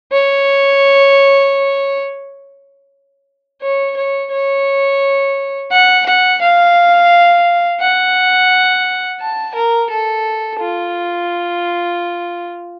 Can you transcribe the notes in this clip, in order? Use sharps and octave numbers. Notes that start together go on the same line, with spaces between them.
C#5
C#5
C#5
C#5
F#5
F#5
F5
F#5
A5
A#4
A4
F4